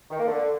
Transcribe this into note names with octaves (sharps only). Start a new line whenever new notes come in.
D#3
A#3
D3